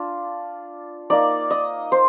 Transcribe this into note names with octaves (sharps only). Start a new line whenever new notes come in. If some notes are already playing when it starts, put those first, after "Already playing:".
Already playing: D4 F4
A#3 D#4 D5
D#5
C5